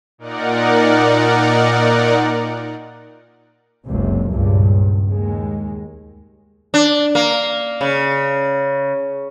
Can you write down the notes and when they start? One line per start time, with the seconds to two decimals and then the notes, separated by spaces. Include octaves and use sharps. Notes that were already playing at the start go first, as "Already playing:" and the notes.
0.18 A#2 D#4 A#4 D5 F#5
3.85 F#1 C#2 C3
4.30 C#2 G2 A#2
5.11 D#2 G#3
6.74 D4
7.15 A#3
7.81 C#3